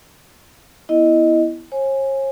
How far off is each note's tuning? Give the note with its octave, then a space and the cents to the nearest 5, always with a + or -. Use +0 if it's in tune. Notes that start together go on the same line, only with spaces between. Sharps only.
B3 +0 E4 -5 D#5 +0
C#5 -45 G#5 +0